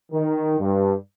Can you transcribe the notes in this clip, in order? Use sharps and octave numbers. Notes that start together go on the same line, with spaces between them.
D#3
G2